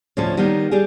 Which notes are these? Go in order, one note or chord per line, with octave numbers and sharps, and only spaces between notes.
D2 A2 F3 C#4 A4
D#3 G3 A#3 B3
G3 G4 G#4